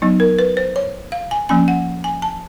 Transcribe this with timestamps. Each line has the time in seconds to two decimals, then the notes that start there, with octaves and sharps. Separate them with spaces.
0.02 F#3 B3 D#4
0.20 A#4
0.39 B4
0.57 C5
0.76 C#5
1.12 F5
1.31 G#5
1.49 F3 A#3 C#4 G#5
1.68 F#5
2.04 G#5
2.22 A5